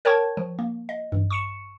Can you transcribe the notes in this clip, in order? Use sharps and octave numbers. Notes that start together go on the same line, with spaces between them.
A#4 C#5 G5 A5 C#6 G#6
F3
A#3
D#5
A1 G2
C#6 C#7 E7